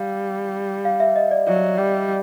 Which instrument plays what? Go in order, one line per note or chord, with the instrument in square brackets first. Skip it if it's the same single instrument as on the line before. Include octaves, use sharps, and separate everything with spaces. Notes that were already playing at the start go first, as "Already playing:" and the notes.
Already playing: [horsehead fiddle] G3 [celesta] F5
[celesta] F5
E5
D#5
D5
[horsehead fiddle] F#3 [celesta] D5
[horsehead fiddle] G3